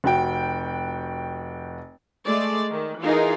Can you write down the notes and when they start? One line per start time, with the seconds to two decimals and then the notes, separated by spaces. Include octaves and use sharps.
0.04 F1 F#4 G5
2.26 G#3 A3 D5
2.71 D#3
3.02 E3 D#4 F4 G#4 A#4